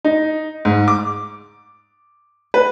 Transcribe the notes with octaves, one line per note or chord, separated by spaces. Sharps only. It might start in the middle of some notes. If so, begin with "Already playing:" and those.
D#4
G#2
D6
B4